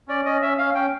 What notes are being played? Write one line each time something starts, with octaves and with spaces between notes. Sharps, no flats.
C#4 D5
C#4 D#5
C#4 E5
C#4 F5
C#4 G5